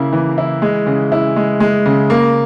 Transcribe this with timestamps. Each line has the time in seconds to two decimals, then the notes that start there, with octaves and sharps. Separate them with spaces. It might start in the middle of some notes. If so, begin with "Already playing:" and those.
Already playing: C#3 A#3 E4
0.13 E3
0.38 E4
0.62 G#3
0.86 C#3
1.12 E4
1.36 G#3
1.60 G#3
1.86 C#3
2.10 A#3